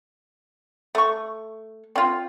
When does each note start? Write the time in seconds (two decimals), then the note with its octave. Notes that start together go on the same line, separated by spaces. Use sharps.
0.95 A3 C#6
1.96 C4 F4